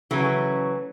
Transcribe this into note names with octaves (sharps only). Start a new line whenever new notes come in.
C#3 E3 F#3 A3 C#4